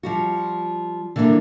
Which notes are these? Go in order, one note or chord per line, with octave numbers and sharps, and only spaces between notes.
F3 G3 F#4
D3 E3 G3 A#3 D4